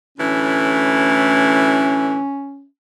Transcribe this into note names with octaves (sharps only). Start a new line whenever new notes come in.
D2 A2 E3 C#4